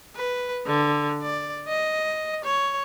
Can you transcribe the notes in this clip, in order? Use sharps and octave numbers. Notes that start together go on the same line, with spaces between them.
B4
D3
D5
D#5
C#5